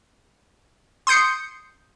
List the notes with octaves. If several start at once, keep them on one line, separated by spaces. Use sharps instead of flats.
C6 D#6 G6 C7 C#7